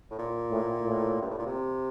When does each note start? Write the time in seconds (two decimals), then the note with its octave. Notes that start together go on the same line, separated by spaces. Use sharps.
0.11 A2
0.19 A#2
0.51 A2
0.82 A2
1.22 G2
1.30 A2
1.38 A#2
1.46 C3